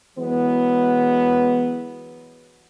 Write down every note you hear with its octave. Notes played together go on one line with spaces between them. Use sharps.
E3 F#3 G#3 B3